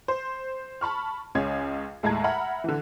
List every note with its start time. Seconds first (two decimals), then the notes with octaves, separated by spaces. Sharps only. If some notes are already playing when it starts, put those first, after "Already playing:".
0.08 C5
0.81 A5 B5 C#6 F6
1.35 C#2 C#4 G#4 G#6
2.03 D#2 A2 G#3 A5 A#5 G#6
2.24 E5 F#5 A#5 B5 F6
2.64 D3 E3